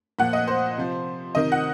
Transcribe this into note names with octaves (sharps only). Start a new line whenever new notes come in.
A#2 F3 F#5
D#5
C5
C3 F3
C3 D#3 D#5
F#5